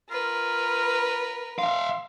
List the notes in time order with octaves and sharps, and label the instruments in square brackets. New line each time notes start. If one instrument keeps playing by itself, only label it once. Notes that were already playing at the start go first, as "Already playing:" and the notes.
[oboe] F4 [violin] A#4 B4
[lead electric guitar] E5 F5 [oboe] C6